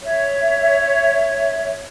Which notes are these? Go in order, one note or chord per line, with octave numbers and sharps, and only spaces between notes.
C#5 E5